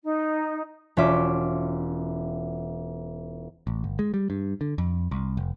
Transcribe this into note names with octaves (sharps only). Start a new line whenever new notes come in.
D#4
E1 C#4 F4 E5 D6
A1
G1
G#3
G3
G2
D3
F2
C2
F1